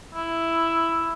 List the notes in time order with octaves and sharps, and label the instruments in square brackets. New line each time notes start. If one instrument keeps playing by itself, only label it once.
[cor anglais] E4